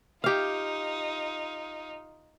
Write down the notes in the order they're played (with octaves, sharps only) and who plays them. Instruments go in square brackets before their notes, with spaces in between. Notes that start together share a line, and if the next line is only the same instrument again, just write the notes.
[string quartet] D#4 F4 [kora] G4 F5